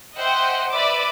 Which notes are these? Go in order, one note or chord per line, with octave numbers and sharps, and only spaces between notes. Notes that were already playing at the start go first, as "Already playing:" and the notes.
C5 D#5 E5 F#5 G5
B4 D5 E5 B5 D6